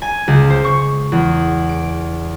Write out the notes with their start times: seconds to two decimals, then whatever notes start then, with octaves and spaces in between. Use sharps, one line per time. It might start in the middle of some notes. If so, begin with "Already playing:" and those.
0.02 G#5
0.28 C#2
0.50 C5
0.65 C#6
1.12 E2
1.69 D7